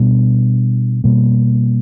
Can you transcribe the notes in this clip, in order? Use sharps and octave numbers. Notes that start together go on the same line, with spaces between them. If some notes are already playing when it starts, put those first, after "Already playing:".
Already playing: B2 G3 B3 D4
B2 G3 A#3